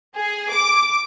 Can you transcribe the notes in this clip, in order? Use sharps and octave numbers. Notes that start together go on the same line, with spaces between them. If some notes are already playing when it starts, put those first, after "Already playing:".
G#4
D6